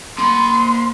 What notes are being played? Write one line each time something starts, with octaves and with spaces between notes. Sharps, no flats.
A#3 B5 C6